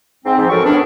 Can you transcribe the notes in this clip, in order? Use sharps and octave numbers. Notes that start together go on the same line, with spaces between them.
G#2 C4
G#2 F3
F2 F#3 A4 A#4 C#6
A2 B3 C#4 D4